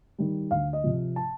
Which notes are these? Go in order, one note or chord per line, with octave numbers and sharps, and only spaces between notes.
D#3 G3
D2 F5
D#5
C3 F3
A5